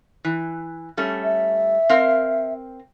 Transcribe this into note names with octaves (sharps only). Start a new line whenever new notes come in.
E3
G3 A3 C#4
E5
C4 A#4 F5